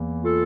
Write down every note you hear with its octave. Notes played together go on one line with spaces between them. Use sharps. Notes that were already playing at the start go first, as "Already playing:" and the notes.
Already playing: E2 E3 A#3
F4 A4